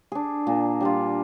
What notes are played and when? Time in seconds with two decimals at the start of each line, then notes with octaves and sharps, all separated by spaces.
0.12 D4 G#4
0.47 A#2
0.81 G3 D4 F4